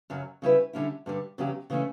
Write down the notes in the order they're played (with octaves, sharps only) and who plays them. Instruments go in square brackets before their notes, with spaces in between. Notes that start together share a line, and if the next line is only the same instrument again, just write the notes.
[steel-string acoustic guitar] F#2 C#3 F#3
C#3 G3 C#4 E4 B4
D3 G3 C#4 E4
G2 D3 G3
E2 C#3 F#3 C#4 G4
C#3 E3 A3 C#4